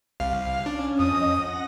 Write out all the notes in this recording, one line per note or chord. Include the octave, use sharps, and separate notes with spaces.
C2 F5
C#4 D4
F2 D#5 D#6
F#5 A#6